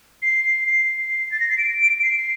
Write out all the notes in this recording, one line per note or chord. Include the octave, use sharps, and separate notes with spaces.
C7
C7
A6
A#6
C7
D7
C7